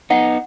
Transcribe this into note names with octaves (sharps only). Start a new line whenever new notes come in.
B3 D#4 F#5